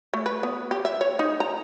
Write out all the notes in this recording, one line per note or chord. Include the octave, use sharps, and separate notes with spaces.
A3
B4
B3
G4
E5
C#5
D#4
A#5